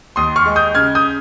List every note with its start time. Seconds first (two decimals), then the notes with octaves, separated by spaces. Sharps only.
0.16 D#2 C6 D#6
0.36 C#6 F6
0.46 G#3
0.56 D#6 G6
0.74 C#3 F6 G#6
0.95 D#6 G6